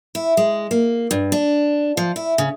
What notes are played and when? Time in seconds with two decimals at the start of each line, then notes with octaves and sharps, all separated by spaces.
0.15 E4
0.37 G#3
0.71 A#3
1.11 G2
1.32 D4
1.97 F3
2.16 E4
2.38 C#3